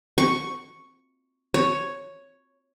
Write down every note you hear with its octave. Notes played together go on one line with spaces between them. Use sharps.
C#6
C#5